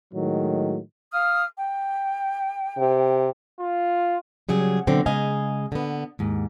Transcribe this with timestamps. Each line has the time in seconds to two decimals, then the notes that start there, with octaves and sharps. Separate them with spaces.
0.14 A2 D#3 F#3 G#3
1.12 F5 D#6 F6
1.56 G5
2.78 C3
3.60 F4
4.49 C#3 F#3 G3 G#4
4.87 B2 D3 F#3 C4
5.06 C#3 G#3 D#5 F5 G#5
5.72 D3 B3
6.19 D#2 G#2